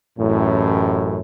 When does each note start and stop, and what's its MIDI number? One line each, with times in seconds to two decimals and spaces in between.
0.18 1.19 33
0.18 1.19 42
0.18 1.19 45